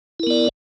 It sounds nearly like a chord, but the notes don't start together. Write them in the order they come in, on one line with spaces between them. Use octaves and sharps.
E4 A#4 B3 D5